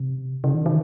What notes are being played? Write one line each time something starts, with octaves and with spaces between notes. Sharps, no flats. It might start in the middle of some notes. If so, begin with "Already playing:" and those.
Already playing: C3
C#3
D#3
D#3